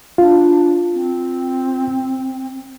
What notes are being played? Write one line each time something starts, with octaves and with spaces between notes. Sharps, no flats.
D4 F4
C4